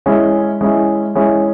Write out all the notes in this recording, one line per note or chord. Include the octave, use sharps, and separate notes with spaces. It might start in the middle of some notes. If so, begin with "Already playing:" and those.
G#3 C#4 E4
G#3 C#4 E4
G#3 C#4 E4